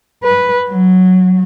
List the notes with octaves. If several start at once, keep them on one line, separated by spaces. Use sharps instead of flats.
B4
F#3